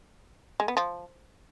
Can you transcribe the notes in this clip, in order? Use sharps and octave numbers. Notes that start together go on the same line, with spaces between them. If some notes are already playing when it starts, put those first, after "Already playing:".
G#3
B3
F3